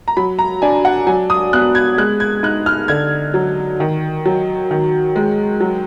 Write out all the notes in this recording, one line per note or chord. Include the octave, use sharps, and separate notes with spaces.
A#5
F#3 B5
A#5
D4 G#5
F#5
F#3 G#5
D#6
B3 F#6
G#6
G#3 F#6
G#6
D#4 F#6
F6
D3 G#6
F#3
D#3
F#3
D#3
G#3
F#3